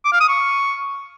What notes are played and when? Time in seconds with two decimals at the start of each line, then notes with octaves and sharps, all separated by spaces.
0.05 D6
0.13 F5
0.20 D#6
0.28 C#6